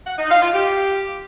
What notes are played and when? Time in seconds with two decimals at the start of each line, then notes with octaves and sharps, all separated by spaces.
0.06 F#5
0.18 D#4
0.29 F5
0.41 F4
0.53 G4